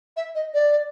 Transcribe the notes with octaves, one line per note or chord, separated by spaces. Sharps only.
E5
D#5
D5